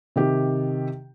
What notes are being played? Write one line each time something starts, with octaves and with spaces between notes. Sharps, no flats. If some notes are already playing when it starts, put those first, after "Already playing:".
C3 D#3 G4